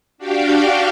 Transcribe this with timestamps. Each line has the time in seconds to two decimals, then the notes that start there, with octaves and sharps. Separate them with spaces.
0.18 D4 F#4 G4 F5 G5